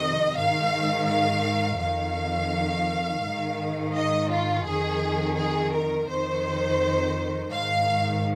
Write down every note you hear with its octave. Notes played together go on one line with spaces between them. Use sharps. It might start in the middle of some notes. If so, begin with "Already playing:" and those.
Already playing: F2 C3 D#3 D#5
G#2 D#3 F5
F5
F2 D#3 F5
G#2 D#3
D#5
F4
F2 D#3 G#4
G#4
A#4
F2 D#3 C5
G#2 D#3 F5